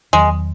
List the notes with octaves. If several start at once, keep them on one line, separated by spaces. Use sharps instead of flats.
E2 D#3 F#3 G#3